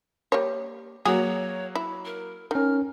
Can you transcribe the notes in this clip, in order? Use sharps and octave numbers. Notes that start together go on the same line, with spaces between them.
G3 A#3 C#5
F#3 A#3 F#4 G#4 C#5
E4
A#4
D#3 C#4 A#4 F6